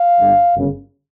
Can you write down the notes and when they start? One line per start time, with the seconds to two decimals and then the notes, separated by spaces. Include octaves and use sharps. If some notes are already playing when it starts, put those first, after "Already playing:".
Already playing: F5
0.19 G1 G2 D3 G3
0.55 G1 F#2 C#3